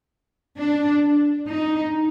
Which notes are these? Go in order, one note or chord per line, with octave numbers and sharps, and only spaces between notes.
D4
D#4